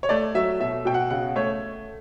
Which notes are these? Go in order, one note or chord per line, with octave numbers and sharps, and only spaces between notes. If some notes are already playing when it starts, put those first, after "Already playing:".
C#5
A3 D5
F#3 E5
B2 E5
B2 G5
F#5
C#3 F#5
A3 C#5